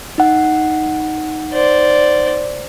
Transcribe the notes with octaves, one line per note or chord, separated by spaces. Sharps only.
D#4 F#5
C5 D5